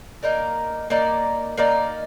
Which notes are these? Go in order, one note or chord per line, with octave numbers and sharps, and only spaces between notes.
A#3 D#4 A#4 D5
A#3 D#4 A#4 D5
A#3 D#4 A#4 D5